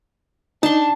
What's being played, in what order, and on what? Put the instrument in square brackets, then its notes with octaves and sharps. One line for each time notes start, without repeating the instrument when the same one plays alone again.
[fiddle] D4 [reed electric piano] D#4 [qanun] A5 C6